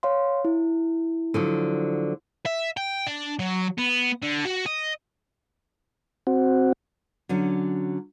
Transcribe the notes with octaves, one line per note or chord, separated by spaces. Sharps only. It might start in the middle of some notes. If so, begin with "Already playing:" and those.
C#5 F5 C6
E4
D3 F3 F#3
E5
G5
D4
F#3
B3
D3
F#4
D#5
C4 F#4
D3 F#3 C#4